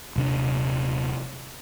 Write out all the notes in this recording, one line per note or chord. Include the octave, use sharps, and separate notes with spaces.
D#1 C3 D4